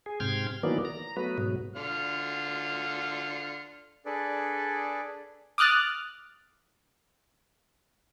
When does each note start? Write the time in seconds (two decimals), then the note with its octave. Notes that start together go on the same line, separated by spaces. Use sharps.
0.06 G#4
0.20 G#2 C3 G5 C6 F6 G#6
0.63 D#3 E3 F#3 A#3 B3 D5
0.85 A#5
1.17 F#3 A3 B3 B4
1.38 G#2 B2 F#3
1.76 D3 F4 F6
4.06 D4 G#4 A4 B4 D5
5.58 D6 D#6 F6 F#6 A6